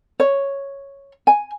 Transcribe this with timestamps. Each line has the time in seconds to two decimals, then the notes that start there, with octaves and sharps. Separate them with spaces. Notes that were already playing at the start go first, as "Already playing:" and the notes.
0.20 C#5
1.27 G#5